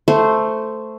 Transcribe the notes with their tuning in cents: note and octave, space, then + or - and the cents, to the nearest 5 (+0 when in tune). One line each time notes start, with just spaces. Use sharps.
A3 +0 C5 -10